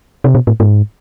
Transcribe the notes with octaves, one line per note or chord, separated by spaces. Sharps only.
C3
B2
A2
G#2